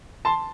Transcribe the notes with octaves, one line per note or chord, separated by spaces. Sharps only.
A5 C6